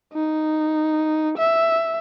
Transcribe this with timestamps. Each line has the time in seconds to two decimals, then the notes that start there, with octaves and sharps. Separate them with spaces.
0.14 D#4
1.38 E5